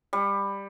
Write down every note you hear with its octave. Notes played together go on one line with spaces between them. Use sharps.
G3